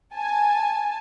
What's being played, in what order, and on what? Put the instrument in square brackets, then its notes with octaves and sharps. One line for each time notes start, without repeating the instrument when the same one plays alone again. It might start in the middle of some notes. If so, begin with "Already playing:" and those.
[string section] G#5 A5